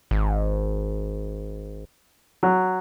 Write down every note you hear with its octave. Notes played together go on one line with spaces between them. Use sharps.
G#1
F#3